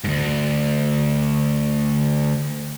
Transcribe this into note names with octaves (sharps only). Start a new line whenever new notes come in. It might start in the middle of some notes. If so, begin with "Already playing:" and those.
D2 G#2